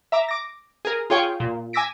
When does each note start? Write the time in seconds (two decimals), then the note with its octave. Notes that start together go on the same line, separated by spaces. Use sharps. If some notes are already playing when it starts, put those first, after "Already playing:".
0.12 E5 A#5 D6
0.29 D6 A#6
0.85 G#4 A#4
1.10 F4 G#4 C#5 G5 C#6
1.40 A#2
1.73 G#5 D6 E6 A#6 B6 D7